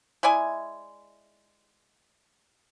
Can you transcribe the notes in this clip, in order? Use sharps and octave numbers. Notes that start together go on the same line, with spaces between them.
G#3 E4 D5 G#5